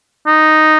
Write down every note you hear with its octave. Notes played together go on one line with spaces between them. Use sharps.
D#4